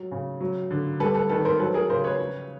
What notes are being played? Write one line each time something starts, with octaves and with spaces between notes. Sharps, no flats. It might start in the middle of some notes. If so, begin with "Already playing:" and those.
Already playing: F#3
C#3
F#3
D3
G3 A4 B4
A4 B4
D#3 A4 B4
A#4 C5
F#3 A4 B4
G#4 A#4
C#3 A#4 C5
B4 C#5
F3